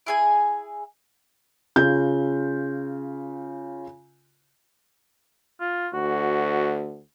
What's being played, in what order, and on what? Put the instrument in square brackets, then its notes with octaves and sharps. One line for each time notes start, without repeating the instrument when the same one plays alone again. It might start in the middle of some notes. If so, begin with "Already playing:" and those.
[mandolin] E4 G#4 G#5
[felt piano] C#3 F4 G6
[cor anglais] F4
[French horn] D2 [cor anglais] F#4